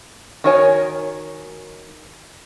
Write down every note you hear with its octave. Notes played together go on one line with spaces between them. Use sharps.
D#3 F#4 A#4 C#5 G#5